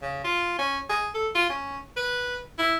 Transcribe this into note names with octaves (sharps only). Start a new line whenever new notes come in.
C#3
F4
C#4
G#4
A4
F4
C#4
B4
E4